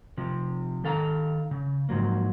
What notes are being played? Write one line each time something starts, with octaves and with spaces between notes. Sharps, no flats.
C3 F3
D#3 A4 F5 A#5
C#3
G#2 F3 F#3 A#3